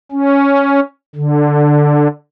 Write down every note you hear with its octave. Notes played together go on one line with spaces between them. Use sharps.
C#4
D3